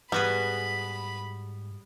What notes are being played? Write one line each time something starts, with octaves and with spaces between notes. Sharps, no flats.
G#2 G3 B3 F#4 G#4 B5